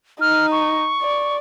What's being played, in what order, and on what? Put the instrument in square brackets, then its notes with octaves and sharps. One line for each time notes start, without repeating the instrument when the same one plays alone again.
[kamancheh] D#4 [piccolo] F6
[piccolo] C#6
[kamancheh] D5